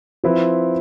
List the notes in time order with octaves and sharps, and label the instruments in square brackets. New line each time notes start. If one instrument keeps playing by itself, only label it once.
[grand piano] F3 C4 E4 B4